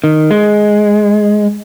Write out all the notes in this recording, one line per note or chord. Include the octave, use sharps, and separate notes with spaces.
D#3
G#3